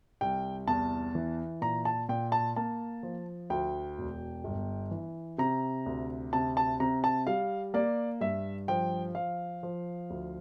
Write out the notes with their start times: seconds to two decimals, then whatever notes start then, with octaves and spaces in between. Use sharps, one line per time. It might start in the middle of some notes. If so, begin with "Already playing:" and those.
0.21 C2 G5
0.67 E2 A5
1.15 E3
1.61 A#2 A#5
1.85 A5
2.09 A#2 G5
2.32 A5
2.56 A#3 A5
3.03 F3
3.50 D2 G5
3.98 E1
4.44 G1
4.91 E3
5.38 C3 A#5
5.86 D2
6.33 C3 A5
6.57 A5
6.80 C3 A#5
7.04 A5
7.27 G3 F5
7.74 A#3 D5
8.21 G2 E5
8.68 F3 G5
9.15 F3 F5
9.63 F3
10.10 D2